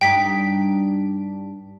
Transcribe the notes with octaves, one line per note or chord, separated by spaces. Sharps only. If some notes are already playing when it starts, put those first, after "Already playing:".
G2 D#4 G5 B6